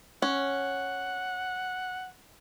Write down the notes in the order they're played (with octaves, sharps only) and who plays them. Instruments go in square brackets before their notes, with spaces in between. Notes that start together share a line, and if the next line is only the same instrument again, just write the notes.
[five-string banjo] C#4 [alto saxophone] F#5